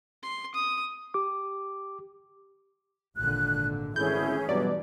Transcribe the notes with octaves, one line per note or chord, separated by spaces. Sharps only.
C6
D#6
G4 D6
G#1 A#2 D3 F#6
G#1 D3 E3 A3 C#4 E4 G#4 G6
G2 B2 F#3 D5